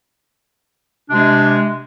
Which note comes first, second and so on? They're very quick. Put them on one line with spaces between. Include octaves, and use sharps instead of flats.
D4 C3 G#3